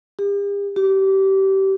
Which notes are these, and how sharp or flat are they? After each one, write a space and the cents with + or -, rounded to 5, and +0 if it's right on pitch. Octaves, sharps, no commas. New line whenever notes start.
G4 +45
G4 -25